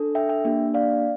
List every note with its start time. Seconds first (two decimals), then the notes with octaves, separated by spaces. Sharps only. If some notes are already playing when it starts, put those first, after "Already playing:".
Already playing: D4 A4
0.15 E5 G5
0.29 E5 G5
0.45 A#3 D4 G4
0.74 D5 F5